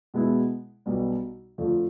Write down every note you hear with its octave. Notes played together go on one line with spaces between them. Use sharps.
B2 G#3 B3 E4
B1 B2 G3 B3 D4
F2 D3 F3 A3